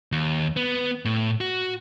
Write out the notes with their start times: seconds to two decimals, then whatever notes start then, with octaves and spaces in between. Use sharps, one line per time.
0.12 D#2
0.56 B3
1.05 A2
1.41 F#4